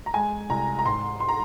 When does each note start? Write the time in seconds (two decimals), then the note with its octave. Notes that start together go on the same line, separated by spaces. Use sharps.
0.06 A#5
0.14 G#3 G#5
0.50 C2 A#5
0.79 A#5
0.85 G#2 C6
1.20 C6
1.29 A#5